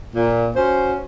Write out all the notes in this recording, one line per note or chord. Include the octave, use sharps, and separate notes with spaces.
A#2
C#4 F#4 C5